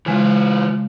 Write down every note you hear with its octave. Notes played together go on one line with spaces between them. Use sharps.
C#3 E3 G#3 F4